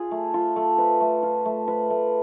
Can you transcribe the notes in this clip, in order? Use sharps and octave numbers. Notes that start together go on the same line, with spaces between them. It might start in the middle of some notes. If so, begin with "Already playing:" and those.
Already playing: F4 G#4
A3
F4
A3
B4
A3
F4
A3
B4
A3